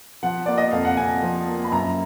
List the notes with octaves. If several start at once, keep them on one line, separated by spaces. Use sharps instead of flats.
F3 F#5
A#3 D5
D#5
F2 F5
F#5
F2 G#5
F3
A#3
B5
F#2 A#5